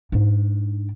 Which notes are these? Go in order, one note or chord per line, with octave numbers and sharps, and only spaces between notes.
G#2 D4